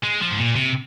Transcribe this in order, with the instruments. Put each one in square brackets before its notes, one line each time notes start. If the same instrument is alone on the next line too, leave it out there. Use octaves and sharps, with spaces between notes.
[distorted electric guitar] G#3
F3
G#2
A#2
C3